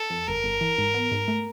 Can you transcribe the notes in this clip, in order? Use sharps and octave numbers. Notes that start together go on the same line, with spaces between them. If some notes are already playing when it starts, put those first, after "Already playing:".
Already playing: A4
F2
G1 A#4
G1
E3
G#2
B3
G#2
A3